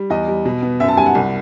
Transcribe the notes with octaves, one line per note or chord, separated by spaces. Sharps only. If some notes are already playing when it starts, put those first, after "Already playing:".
Already playing: G3
E2 D#5
G3
B2
B3
F#2 E5
A5
G3 G#5
F#5
C2